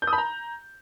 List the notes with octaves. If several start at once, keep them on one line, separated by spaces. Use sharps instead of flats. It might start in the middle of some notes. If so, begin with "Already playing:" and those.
G6
D#6
B5
A#5